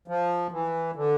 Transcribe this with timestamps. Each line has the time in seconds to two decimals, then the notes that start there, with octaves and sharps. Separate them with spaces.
0.08 F3
0.52 E3
0.96 D3